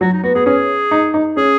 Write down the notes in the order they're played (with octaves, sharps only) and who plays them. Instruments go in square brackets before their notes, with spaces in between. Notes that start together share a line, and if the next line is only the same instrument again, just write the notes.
[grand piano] F#3 [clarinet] F#4
[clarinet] D#4
[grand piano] B3 [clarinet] F#4
[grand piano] B3 [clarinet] G#4
[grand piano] C#4 [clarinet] G#4
[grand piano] D#4
D#4
[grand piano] C#4 [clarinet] G#4